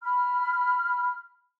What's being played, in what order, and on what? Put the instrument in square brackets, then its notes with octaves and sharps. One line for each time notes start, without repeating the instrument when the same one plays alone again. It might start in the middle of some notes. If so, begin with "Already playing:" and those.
[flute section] B5 F6